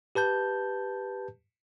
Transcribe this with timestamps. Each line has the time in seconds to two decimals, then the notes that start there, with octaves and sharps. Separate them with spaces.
0.15 G4 B4 A5 G6